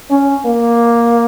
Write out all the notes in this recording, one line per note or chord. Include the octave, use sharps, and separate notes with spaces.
C#4
A#3